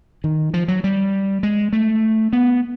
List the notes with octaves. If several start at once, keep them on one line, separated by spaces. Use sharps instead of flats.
D#3
F3
F#3
G3
G#3
A3
B3